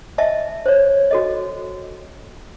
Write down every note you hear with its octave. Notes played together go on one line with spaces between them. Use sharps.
D#5 E5 A5
C5 C#5
F#4 A4 D#5